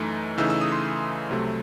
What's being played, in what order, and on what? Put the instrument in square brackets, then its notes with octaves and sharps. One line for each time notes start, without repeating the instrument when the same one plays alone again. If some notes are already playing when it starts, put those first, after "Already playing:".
Already playing: [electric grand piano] F#2 E3 A3 D#4
C#3 E3 A3 D#4 E6
E6
D#6
C6
C2 C3 F#3 A3